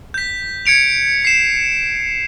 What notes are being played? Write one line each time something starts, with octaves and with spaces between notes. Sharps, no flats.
G6 B6
G#6 C#7 D7 F7
C7 E7